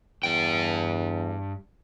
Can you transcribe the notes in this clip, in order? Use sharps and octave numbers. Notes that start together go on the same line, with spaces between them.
E2 G2 G5